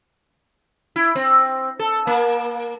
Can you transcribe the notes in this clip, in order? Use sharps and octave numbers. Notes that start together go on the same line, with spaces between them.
E4
C4
A4
A#3